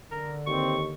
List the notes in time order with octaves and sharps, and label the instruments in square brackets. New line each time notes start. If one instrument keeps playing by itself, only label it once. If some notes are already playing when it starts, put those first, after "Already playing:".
[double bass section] D3 [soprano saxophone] A#4
[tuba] D#2 [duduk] C4 [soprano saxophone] C#6